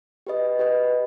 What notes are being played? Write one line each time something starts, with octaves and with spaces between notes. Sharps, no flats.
G4 B4 D#5
G4 B4 D#5